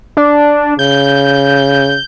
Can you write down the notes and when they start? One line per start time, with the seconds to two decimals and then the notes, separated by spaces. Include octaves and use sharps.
0.17 D4
0.79 C#3 G6